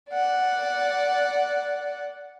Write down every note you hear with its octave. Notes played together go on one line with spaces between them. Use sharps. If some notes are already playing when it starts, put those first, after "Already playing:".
D5 F#5